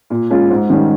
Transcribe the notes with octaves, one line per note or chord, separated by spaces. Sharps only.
A#2
G#3 C#4 F4
G#2
D#3 G3 C#4